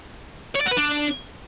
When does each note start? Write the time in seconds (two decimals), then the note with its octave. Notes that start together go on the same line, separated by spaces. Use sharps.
0.56 C#5
0.61 D5
0.66 F#4
0.72 B4
0.77 D4